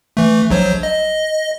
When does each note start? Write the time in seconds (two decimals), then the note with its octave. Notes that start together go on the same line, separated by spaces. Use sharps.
0.17 E3 A3
0.50 A#1 F#3 C5
0.83 D#5